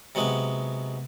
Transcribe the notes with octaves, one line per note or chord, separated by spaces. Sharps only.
C3 F#3 G#3 B3